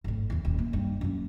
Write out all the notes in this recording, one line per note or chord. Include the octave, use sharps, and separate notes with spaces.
G#1 A2
D#2 E4
D#1
A#3
G2
F#2 A#3